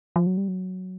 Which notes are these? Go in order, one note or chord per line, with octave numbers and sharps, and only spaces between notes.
F3
F#3
G3
F#3